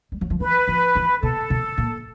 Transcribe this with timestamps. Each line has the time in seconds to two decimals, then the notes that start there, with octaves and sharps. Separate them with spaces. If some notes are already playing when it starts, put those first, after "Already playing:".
0.12 G3
0.21 F#3
0.30 F3
0.40 E3 B4
0.68 F3
0.95 E3
1.23 B2 A4
1.50 B2
1.78 A#2